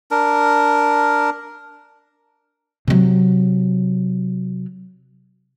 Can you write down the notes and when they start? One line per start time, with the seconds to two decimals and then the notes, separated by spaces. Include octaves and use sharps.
0.11 D4 A#4
2.88 C3 F#3